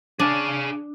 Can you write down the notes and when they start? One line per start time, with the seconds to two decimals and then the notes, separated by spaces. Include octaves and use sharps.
0.19 D4 G#4 F5